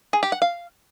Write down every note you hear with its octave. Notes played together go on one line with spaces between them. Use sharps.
G#4
G4
F#5
F5